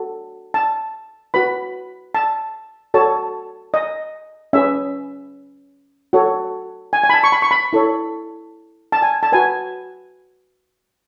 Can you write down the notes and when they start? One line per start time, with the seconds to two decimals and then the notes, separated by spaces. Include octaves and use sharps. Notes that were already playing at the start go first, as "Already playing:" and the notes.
Already playing: F#4 A4
0.54 A5
1.34 F#4 B4 B5
2.15 A5
2.94 F#4 A4 C#5 A5
3.74 D#5
4.53 C#4 G#4 B4 E5
6.13 F#4 A4 C#5
6.93 G#5
7.04 G#5
7.10 B5
7.14 A5
7.24 C#6
7.32 B5
7.42 C#6
7.51 B5
7.73 E4 A4 C#5
8.92 A5
9.02 G#5
9.23 A5
9.32 F#4 B4 G#5